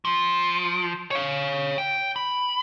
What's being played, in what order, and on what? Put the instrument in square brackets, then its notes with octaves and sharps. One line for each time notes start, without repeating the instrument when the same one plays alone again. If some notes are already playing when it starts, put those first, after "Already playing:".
[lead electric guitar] F3
C#5 F5
G5
B5